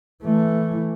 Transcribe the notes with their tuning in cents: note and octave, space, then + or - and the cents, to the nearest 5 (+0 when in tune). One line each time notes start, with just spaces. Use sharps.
E3 +0 A3 +0